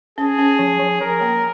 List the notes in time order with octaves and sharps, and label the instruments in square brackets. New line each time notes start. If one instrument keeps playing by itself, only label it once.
[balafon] C#4 [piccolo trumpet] G#4
[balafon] C#4
F3
F3
[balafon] F3 [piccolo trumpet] A#4
[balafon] A#3